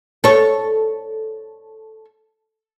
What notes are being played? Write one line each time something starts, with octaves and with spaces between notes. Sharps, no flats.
A4 C#5